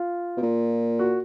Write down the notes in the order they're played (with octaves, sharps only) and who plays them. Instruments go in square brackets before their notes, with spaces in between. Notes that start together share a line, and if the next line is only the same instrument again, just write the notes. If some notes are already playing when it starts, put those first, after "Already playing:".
Already playing: [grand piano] F4
[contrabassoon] B2
A#2
[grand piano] F#4